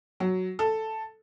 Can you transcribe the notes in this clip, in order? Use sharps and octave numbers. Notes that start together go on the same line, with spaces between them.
F#3
A4